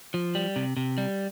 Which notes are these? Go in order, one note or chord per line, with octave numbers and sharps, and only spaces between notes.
F3
G3
C3
C3
G3